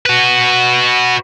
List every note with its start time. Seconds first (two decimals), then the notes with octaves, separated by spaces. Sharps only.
0.06 F#4 B4